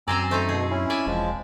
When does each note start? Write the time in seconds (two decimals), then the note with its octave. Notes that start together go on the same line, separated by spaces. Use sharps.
0.08 F#2 C4 C5 D5 G#5 A#5 E6
0.31 A3 C4 D#4 C5
0.49 B2 G#4
0.70 C#4 E4
0.90 D5 E5 G#5
1.06 E1 F3 G#3